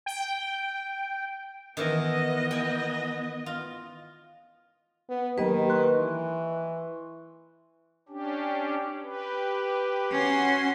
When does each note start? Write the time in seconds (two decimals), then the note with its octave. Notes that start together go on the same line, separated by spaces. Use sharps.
0.06 G5
1.77 D#3 E3 B3 D#5
2.51 G5 G#5
3.46 F4
5.10 B3
5.38 D#3 F#3 A#3 G4 B4 D#5
5.70 C6 C#6 F#6
5.99 E3
8.09 C#4 D4 G4
9.03 G4 B4
10.11 C#4 F#4 C6